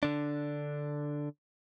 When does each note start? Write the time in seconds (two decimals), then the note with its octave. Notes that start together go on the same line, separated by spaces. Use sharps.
0.03 D3 D4